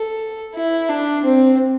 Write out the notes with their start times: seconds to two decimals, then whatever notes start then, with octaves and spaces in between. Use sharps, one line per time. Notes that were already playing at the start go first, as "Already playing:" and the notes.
Already playing: A4
0.55 E4
0.89 D4
1.24 C4